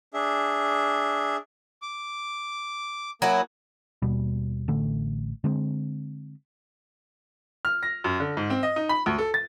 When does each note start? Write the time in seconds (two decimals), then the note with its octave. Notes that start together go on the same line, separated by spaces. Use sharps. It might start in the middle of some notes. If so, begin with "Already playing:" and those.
0.14 D4 G#4 E5
1.82 D6
3.22 F#3 A#3 E4 G#5 D#6
4.02 D#2 B2 G3
4.68 A1 D3 A3
5.44 D3 G#3 C4
7.65 F6
7.83 A#6
8.04 F#2
8.20 D3
8.37 G#2
8.50 C4
8.63 D#5
8.76 D#4
8.89 B5
9.06 D2
9.18 A4
9.34 A6